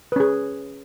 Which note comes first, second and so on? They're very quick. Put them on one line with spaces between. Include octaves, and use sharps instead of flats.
B4 C#4 G#4